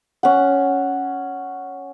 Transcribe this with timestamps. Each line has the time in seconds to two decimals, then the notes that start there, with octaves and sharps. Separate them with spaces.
0.23 C#4 F#5